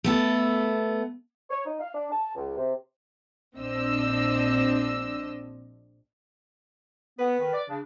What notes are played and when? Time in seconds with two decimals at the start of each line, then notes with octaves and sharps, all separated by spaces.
0.04 A3 B3 A4
1.50 C#5
1.66 D#4
1.80 F5
1.94 D4
2.12 A5
2.35 C#2
2.57 C3
3.57 A#1 C4 D4 D#5 E6
7.19 B3 B4
7.39 D#3
7.53 D5
7.68 C#3 D4